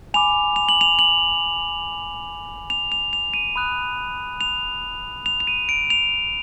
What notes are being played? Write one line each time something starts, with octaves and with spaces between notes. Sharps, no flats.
G#5 B5 D6 F7
F7
F#7
F7
F#7
F7
F7
F7
D#7
B5 D#6 F#6
F7
F7
F7
D#7
D7
F7